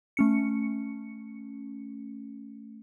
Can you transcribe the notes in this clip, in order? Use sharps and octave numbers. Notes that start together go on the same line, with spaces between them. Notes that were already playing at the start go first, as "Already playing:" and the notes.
A3 C#4 C#7